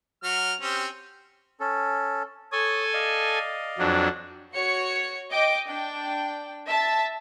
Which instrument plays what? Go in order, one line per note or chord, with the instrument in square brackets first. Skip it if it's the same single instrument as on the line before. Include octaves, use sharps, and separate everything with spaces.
[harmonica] F#3 F6
C4 C#4 G4
[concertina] C#4 A4
[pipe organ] A4 G#5 [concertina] C#5 D#6
[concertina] D5 D#5 F5
[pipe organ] F2 F#3 D4
[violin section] F#4 C#5 C#7
D#5 G5 D6 D7
D4 G5
E5 A5 A6